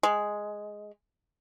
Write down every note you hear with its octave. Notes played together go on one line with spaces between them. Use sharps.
G#3